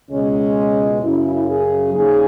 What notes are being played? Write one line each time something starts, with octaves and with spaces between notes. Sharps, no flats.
C#2 B2 G#3 C#4
F#2 C#3 F#3 E4
G#4
D#2 C#3 G#4